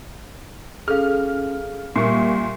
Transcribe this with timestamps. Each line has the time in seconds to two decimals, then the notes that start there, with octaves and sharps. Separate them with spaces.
0.88 C#4 G#4 A4 F5 F6
1.96 A#2 G3 A#3 E5 C#6 C7